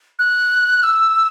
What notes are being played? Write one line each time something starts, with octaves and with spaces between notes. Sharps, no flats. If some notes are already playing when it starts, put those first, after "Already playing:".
F#6
E6